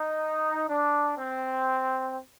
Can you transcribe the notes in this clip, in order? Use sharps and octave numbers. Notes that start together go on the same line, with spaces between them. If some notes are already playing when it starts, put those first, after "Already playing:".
Already playing: D#4
D4
C4